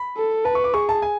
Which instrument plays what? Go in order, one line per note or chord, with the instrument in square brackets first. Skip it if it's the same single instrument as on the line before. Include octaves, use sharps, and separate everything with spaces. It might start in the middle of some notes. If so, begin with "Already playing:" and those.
Already playing: [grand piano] B5
[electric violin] A4
[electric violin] B4 [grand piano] A5
[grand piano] C#6
D6
[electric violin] G#4 [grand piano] C#6
[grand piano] A5
G#5